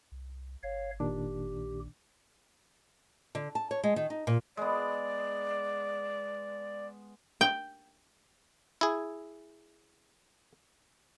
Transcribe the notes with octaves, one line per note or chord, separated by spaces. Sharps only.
C2
G1 C#5 F5
A#2 D#3 D4 G4
A#1
D3
A5
C#5
G#3
D#3
D#4
A#2
G#3 B3 D5
G5
E4 G#4